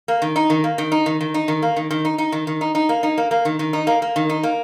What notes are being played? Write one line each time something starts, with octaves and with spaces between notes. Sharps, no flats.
A#3
D#3
D#4
D#3
A#3
D#3
D#4
D#3
D#3
D#4
D#3
A#3
D#3
D#3
D#4
D#4
D#3
D#3
D#4
D#4
A#3
D#4
A#3
A#3
D#3
D#3
D#4
A#3
A#3
D#3
D#4
A#3